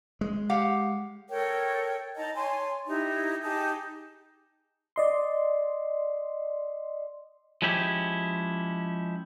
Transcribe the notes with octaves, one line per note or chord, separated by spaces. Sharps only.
G#3
G4 F5 F#5
A4 A#4 C#5 G5
D#4 D#5 A5 A#5
C#5 G#5 A5 C6
D#4 E4 G4 A#5
D#4 G4 G#4 A5
D5 D#5 C6
F3 G#3 C#4 E4 G4